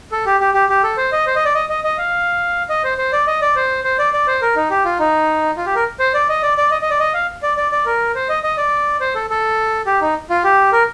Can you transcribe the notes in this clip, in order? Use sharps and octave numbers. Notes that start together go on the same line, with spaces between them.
A4
G4
G4
G4
G4
A4
C5
D#5
C5
D#5
D5
D#5
D#5
D#5
F5
D#5
C5
C5
D5
D#5
D5
C5
C5
D5
D5
C5
A#4
D#4
G4
F4
D#4
F4
G4
A#4
C5
D5
D#5
D5
D5
D#5
D#5
D5
D#5
F5
D5
D5
D5
A#4
C5
D#5
D#5
D5
C5
A4
A4
G4
D#4
F4
G4
A#4